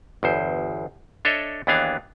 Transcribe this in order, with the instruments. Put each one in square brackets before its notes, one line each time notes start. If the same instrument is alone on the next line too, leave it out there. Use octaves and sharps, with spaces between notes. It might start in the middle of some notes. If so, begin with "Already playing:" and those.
[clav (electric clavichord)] G1 E2 C5
D4 A4 C#5 D#5 E5
D#2 E3 B3 D4 G#4 F5